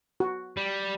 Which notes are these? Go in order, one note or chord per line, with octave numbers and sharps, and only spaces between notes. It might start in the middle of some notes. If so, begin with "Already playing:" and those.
F#4
G3